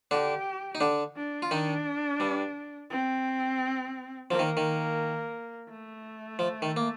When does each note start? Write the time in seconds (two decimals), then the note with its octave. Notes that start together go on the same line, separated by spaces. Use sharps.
0.11 D3 D4 G4
0.75 D#4
0.80 D3 D4
1.16 D4
1.42 F4
1.51 D#3 D4 D#4
2.20 G2 G3
2.90 C4
4.30 F3 A#3
4.39 D#3
4.57 D#3
5.69 A3
6.39 F3
6.62 D#3
6.77 A#3